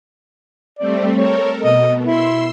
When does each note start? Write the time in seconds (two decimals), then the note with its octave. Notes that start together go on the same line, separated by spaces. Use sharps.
0.79 G3 A3 C4 D5
1.17 A4 A#4 C#5
1.63 B2 D#5
2.06 E4 C6 E6